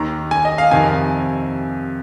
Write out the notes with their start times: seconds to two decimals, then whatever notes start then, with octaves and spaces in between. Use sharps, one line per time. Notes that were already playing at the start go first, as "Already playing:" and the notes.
Already playing: D#2 D#3 A#5
0.31 G#5
0.45 D#5
0.58 F5
0.71 F2 C3 D#3 G#5